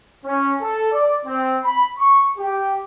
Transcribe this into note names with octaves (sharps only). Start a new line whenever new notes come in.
C#4
A4
D5
C4
B5
C#6
G4